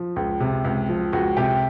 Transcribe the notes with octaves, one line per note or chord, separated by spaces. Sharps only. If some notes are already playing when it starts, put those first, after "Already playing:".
Already playing: F3
C#2
C3
C#2
F3
C#2 F#4
C3 G4